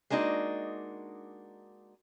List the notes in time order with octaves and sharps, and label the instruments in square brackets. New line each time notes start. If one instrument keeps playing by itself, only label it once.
[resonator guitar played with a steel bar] G#3 A#3 D4 D#4 F#4